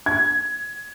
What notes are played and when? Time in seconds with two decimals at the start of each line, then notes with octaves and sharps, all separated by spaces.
0.06 G#6